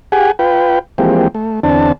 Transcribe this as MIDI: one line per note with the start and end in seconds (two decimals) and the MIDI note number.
0.12 0.32 67
0.12 0.32 68
0.12 0.32 78
0.12 0.32 80
0.39 0.79 65
0.39 0.79 71
0.39 0.79 79
0.98 1.28 52
0.98 1.28 53
0.98 1.28 56
0.98 1.28 58
0.98 1.28 60
0.98 1.28 67
1.35 1.60 57
1.63 1.92 40
1.63 1.92 50
1.63 1.92 60
1.63 1.92 62
1.63 1.92 81